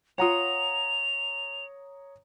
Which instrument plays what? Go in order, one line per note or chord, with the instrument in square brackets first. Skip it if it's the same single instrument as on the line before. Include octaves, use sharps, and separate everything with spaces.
[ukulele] F4 F#5 [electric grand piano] C#5 A#5 D#6 [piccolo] F7